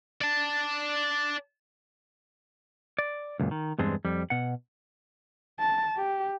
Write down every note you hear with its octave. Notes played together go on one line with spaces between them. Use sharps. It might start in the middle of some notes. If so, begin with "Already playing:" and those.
D5 A5
D5
C#2 F#2 A#2
D#3
E2 G2 G#3 C4 D4
F2 G3
B2 F#5
A5
G4